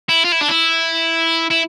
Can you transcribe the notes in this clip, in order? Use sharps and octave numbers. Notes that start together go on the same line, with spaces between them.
E4
F4
E4
D4
E4
E4